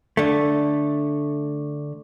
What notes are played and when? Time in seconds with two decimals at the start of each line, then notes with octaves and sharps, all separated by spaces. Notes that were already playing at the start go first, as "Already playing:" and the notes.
0.17 D3 A3